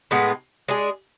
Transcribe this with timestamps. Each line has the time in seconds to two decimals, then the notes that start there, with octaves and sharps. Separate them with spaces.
0.11 A2 G#3 B3
0.68 G#3 D4 G#4